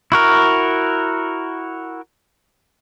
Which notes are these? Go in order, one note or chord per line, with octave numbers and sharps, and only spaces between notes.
E4 F#4 A#4